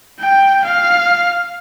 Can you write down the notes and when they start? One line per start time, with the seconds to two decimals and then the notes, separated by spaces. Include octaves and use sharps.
0.20 G5
0.65 F5